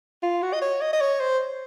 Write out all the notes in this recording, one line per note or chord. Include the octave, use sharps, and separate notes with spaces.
F4
F#4
D#5
C#5
D#5
D#5
C#5
C5